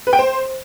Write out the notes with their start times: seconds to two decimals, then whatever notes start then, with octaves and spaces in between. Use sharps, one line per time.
0.07 B4
0.13 G5
0.19 C5